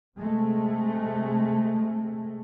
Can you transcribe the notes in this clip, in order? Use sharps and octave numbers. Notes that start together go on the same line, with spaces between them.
C3 G#3 A3